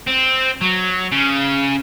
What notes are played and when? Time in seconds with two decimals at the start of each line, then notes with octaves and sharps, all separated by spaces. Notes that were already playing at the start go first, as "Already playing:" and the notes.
0.07 C4
0.61 F#3
1.12 C#3